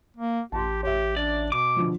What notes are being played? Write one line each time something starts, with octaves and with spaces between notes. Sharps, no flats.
A#3
A1 G4 A5 C6
G4 C#5 E5
D4 D5
B2 D6
D3 F3